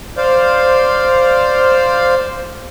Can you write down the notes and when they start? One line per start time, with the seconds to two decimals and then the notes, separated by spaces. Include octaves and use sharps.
0.17 C5 D5 F5